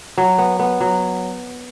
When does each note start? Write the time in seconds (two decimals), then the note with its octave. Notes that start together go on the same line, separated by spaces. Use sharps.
0.18 F#3
0.38 B3
0.59 B3
0.81 F#3